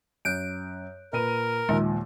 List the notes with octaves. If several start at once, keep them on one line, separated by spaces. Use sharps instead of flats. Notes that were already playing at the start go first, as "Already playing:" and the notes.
F#2 F#6 G6 D7
A#2 A#4 B4 D#7
D#2 A#2 F3 G#3